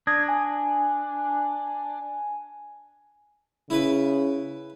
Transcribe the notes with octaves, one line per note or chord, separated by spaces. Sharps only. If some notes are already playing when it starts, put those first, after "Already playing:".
D4 D#6 G#6 A#6
G#5
C#3 E4 B4